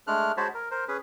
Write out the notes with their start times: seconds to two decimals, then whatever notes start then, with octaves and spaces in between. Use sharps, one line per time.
0.07 G#3 A3 D4 F6 F#6
0.37 G#3 F#4 C5 C#5 A5 B5
0.54 A#4
0.71 A#4 C5
0.88 C#4 G#4 B4